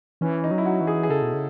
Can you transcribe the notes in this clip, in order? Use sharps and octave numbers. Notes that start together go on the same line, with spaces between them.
E3 C#4
D#4
F#3
E4
F#4
E3
G#4
G#4
C#3 A4
B2
C#3